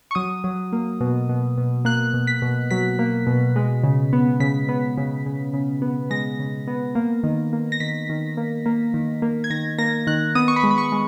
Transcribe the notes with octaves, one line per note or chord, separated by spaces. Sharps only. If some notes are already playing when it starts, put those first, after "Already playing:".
C#6
F#3 D#6
F#3
A#3
B2
B2
B2
A#3 F#6
B2
B6
B2
F#3 B6
A#3
B2
G#3
C#3
B3
C#3 B6
B3
C#3
C#3
C#3
B3
G#3 A#6
C#3
B3
A#3
D#3
A#3
A#6
D#3 B6
D#3
A#3
A#3
D#3
A#3
G#6
D#3 A#6
A#3 A#6
D#3 F#6
B3 D#6
C#6
B5
G#3
B5
C#6
G#3